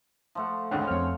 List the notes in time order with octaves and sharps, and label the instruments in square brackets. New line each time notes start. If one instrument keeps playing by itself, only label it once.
[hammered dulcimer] F3 A3 F#5
[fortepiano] G#1 C#2 D3 [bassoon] C#4
[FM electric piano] F2 F6 [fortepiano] C4 C#5